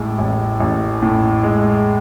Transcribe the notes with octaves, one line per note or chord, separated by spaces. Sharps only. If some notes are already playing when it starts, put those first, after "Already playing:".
Already playing: A1 A2 G#3
A1
A1
A2
G#3